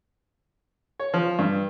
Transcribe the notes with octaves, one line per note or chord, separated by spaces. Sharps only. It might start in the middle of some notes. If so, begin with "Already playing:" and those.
C#5
F3
G2